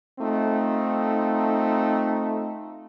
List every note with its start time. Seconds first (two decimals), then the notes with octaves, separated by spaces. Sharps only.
0.20 A3 C4 D#4 F4